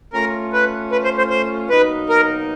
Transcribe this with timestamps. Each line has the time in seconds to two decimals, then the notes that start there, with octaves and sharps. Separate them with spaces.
0.13 A3 C#4 F4 A#4
0.53 B4
0.92 B4
1.04 C5
1.18 C5
1.30 C5
1.70 B2 F#3 A#3 D#4 B4
2.09 A#4